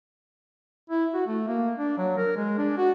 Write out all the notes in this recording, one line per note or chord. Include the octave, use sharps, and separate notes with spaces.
E4
F#4
A3
A#3
D4
F#3
A#4
G#3
D4
F#4